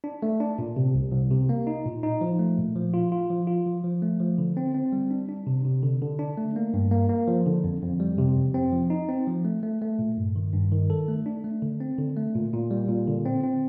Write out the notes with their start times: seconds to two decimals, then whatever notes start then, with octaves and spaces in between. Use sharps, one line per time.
0.04 D4
0.22 A3
0.40 D4
0.59 A#2
0.76 C3
0.95 C2
1.12 C2
1.31 C3
1.49 A#3
1.67 D#4
1.85 A#2
2.03 D#4
2.21 F3
2.39 A3
2.58 A#2
2.75 F3
2.94 F4
3.12 F4
3.30 F3
3.47 F4
3.66 F3
3.84 F3
4.02 A3
4.20 F3
4.38 D3
4.57 C4
4.75 C4
4.92 G3
5.11 D4
5.29 D4
5.47 C3
5.65 C3
5.83 D3
6.02 D3
6.19 D4
6.37 A3
6.56 A#3
6.74 G2
6.91 A#3
7.09 A#3
7.28 F3
7.46 D3
7.64 F2
7.82 F2
8.00 G3
8.18 C3
8.36 F2
8.54 C4
8.72 F3
8.90 D#4
9.09 C4
9.27 F3
9.45 A3
9.63 A3
9.82 A3
9.99 A#2
10.17 G2
10.36 D#3
10.53 G2
10.72 D#3
10.90 A4
11.08 A3
11.26 D4
11.44 A3
11.62 D3
11.80 C4
11.98 D3
12.17 A3
12.35 A#2
12.53 A#2
12.71 G3
12.89 A#2
13.07 D3
13.26 C4
13.43 C4